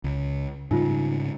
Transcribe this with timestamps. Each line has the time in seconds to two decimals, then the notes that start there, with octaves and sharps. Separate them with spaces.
0.04 C#2
0.71 G#2 C#3 G3 D#4 F4